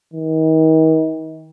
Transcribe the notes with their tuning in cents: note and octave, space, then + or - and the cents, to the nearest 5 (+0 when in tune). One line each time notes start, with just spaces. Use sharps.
D#3 +40